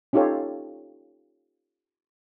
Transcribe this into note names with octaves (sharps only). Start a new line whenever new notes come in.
C#4 D#4 F4 G4 A4 C#5